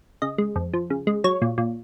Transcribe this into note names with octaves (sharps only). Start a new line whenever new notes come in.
C#3 D#5
G#3
F2
F3
C#3
G#3
F#3 C#5
A#2
A#2